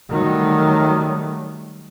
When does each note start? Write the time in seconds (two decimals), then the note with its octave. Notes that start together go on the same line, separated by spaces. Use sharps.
0.10 D#3 F#3 G3 A3